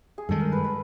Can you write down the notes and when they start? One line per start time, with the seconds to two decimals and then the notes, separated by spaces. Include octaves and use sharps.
0.18 G#4
0.29 G2 D#3 G#3 A4
0.41 A#4
0.52 B4
0.64 B4